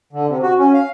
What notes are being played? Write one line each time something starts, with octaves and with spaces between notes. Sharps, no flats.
D3
C3
F#4
C#4
F5